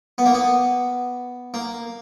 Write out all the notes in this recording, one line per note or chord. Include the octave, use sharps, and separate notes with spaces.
B3
A#3
B3
A#3